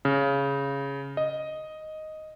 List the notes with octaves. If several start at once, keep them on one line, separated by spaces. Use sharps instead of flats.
C#3
D#5